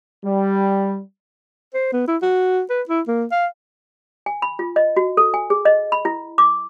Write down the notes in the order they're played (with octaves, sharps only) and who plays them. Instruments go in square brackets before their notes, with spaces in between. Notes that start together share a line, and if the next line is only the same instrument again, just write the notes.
[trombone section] G3
[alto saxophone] C5
B3
E4
F#4
B4
E4
A#3
F5
[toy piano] G#5
B5
F4
D#5
F#4
A4
G#5
G#4
D#5
B5
E4
D6